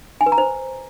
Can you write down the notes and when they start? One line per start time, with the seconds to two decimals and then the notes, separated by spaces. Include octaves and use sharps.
0.21 G#5
0.26 B4
0.32 A#5
0.38 C5